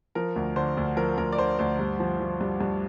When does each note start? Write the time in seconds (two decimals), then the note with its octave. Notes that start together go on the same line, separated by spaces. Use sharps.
0.15 F3 A#4
0.36 D2
0.56 D3 C5
0.77 D2
0.97 F3 A#4
1.18 D2 A#4
1.32 D5
1.38 D3 C5
1.59 D2 C5
1.79 G2
2.00 F3
2.20 F3
2.41 G2
2.61 G2